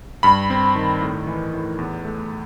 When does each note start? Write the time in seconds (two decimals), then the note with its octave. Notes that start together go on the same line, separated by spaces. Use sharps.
0.23 G2 B5
0.50 C4
0.75 D#3
1.01 A2
1.27 E3
1.54 A2
1.78 E2
2.05 A3